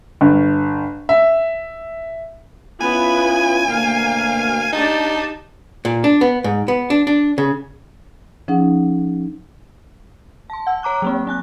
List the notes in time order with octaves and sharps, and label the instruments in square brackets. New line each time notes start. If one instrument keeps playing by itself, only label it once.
[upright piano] G1
E5
[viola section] B3 B4 [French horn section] C#4 E4 F4 [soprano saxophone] G#5
[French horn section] D2 B2 A#3 [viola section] F5
[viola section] D4 G4 A5 [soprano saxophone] D#4
[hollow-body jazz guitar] A#2
D4
B3
G#2
B3
D4
D4
C#3
[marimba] F3 C#4 D#4 G#4 F#5
[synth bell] A5 C6
F#5 E6
C#5 A#5 D6 F#6
F#3 A#3 C4
C4 G#5 F#6